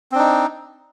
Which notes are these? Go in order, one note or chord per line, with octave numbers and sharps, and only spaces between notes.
C4 D4 D#4